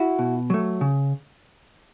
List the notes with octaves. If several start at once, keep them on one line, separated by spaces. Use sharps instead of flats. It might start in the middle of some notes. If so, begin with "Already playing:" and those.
Already playing: E4 F#4
B2
F#3 A3
C#3